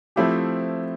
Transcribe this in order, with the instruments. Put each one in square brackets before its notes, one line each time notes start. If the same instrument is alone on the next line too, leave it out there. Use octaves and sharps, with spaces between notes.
[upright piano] F3 A3 C4 E4 G4